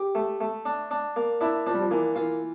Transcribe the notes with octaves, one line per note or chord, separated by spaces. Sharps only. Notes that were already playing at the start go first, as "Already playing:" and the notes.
Already playing: G4
A3
A3
D4
D4
A#3
D4 E4
F3 D4
G3
F3
E3 A#3
E3 F4